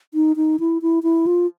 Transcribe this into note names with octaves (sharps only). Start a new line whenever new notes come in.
D#4
D#4
E4
E4
E4
F4